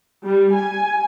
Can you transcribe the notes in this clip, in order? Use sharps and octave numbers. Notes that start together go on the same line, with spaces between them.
G3
G#5